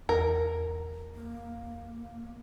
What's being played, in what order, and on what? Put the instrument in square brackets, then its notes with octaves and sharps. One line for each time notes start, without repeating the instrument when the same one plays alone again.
[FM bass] E2 [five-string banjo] A#4
[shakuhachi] A#3